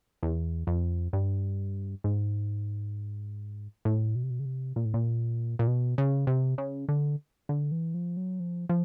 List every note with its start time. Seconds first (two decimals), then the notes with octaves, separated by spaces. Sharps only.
0.23 E2
0.67 F2
1.13 G2
2.04 G#2
3.85 A2
4.15 B2
4.23 C3
4.30 B2
4.40 C#3
4.45 C3
4.76 A#2
4.85 A2
4.94 A#2
5.59 A#2
5.67 B2
5.98 C#3
6.27 C3
6.58 C#3
6.89 D3
7.49 D3
7.72 E3
7.94 F3
8.17 F#3
8.40 F3
8.69 F3